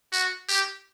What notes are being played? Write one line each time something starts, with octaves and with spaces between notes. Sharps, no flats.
F#4
G4